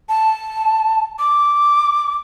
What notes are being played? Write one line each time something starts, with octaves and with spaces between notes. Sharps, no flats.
A5
D6